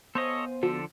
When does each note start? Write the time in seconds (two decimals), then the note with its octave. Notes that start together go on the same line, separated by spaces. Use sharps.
0.15 B3 A4 C5 C#5 D#5 F5 G#5
0.63 D3 F3 F#4 A4